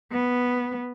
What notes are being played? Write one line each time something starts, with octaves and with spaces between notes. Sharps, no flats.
B3